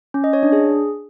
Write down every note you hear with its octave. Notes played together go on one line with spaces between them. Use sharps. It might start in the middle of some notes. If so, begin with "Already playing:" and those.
C#4
D#5
C#5
D4
G#4